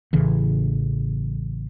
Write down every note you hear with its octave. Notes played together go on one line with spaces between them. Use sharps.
A1 C#3 E3